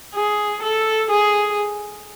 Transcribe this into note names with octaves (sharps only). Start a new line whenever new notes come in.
G#4
A4
G#4